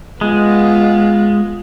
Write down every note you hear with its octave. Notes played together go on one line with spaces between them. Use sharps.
G#3 B3 F4